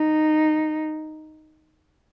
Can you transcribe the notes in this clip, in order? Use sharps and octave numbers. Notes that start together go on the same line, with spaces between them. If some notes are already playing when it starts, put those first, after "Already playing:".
Already playing: D#4